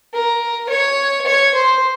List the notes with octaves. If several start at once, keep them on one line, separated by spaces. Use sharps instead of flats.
A#4
C#5
C#5
C5